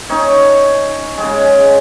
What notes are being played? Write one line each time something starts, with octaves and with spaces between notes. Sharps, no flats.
C#4 D#4 C#5
C#3 G#3